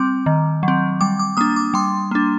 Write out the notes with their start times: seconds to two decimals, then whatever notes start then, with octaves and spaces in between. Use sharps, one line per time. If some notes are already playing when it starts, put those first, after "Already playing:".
Already playing: G3 C4 D6
0.26 D#3
0.63 F#3
0.68 C4
1.01 G3 D6
1.19 D6
1.37 A#3 D4 D#6
1.56 D6
1.74 G3 C6
2.11 A#3 D4